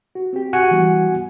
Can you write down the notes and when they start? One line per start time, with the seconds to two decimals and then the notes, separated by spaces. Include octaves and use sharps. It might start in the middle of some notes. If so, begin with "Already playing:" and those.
0.15 F#4
0.33 C4 G4
0.53 F#4 F#5 G#5
0.71 E3 G3 B3